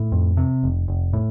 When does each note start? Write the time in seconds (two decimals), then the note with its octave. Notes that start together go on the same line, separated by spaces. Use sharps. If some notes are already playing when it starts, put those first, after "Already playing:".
Already playing: A2
0.12 F2
0.37 C3
0.63 F1
0.88 F1
1.13 A2